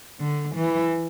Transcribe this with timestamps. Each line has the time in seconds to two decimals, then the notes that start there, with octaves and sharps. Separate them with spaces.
0.20 D3
0.56 E3